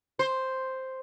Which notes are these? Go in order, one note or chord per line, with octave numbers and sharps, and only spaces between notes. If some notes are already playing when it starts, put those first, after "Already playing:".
C5